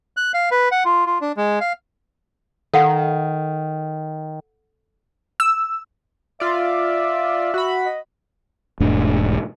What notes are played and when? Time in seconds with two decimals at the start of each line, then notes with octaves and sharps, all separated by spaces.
0.17 F#6
0.34 F5
0.51 B4
0.72 F#5
0.85 F4
1.06 F4
1.21 D4
1.37 G#3
1.61 F5
2.74 D#3 A4 F5 F#5
5.40 E6
6.40 F4 D5 E5
7.54 F#4 B5
7.85 D#5
8.80 E1 G#2 A3 D4